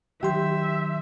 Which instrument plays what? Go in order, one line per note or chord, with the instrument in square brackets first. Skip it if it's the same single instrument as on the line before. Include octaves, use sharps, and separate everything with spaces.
[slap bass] D#3 [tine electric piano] F#3 C6 G6 [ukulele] G4 [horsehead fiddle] E5